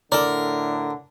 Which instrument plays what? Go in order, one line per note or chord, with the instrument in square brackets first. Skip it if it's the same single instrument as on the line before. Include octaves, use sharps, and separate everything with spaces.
[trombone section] A2 D3 [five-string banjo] A4 D5 [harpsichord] A#4